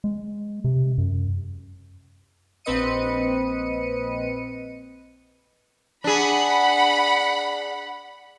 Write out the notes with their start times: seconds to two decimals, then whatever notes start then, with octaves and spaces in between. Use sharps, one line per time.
0.04 G#3
0.64 C3
0.98 F#2
2.65 A#1 C4 B4 D#5 C#7 D#7
6.04 D4 G#4 F#5 B5